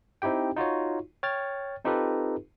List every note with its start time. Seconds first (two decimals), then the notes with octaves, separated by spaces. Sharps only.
0.22 C4 D#4 E4 G4 G5
0.56 D#4 F4 F#4 C#5
1.23 C#5 G5 F6 A6
1.84 C4 D#4 F4 G4 A4 B4